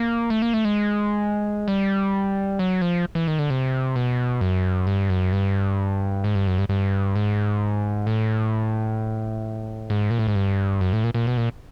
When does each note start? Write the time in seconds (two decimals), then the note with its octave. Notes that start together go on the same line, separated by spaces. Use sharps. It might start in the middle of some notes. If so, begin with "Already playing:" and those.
Already playing: A#3
0.30 A3
0.42 A#3
0.53 A3
0.65 G#3
1.68 G3
2.59 F#3
2.81 F3
3.15 E3
3.28 D#3
3.39 D3
3.50 C3
3.96 B2
4.41 F#2
4.87 G2
5.10 F#2
5.32 G2
6.24 G#2
6.35 G2
6.47 F#2
6.58 G2
6.69 G2
7.16 G#2
8.07 A2
9.90 G#2
10.10 A#2
10.19 A2
10.28 G#2
10.35 G2
10.81 F#2
10.93 A2
11.04 A#2
11.14 A#2
11.27 B2
11.37 A#2